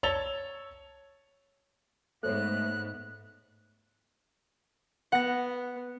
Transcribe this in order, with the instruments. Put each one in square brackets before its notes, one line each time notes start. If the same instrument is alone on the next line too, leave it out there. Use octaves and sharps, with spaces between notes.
[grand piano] C#5 A5 E6 A6 F7 G7
[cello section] G#2 B3 [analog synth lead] A3 [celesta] A4 C5 C#5 [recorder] F#6
[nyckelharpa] B3 [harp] F#5 A#6